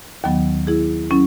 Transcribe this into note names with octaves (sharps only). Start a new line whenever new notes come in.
D#2 D#3 F#3 B3
E4 G#4
F#3 C#4 E4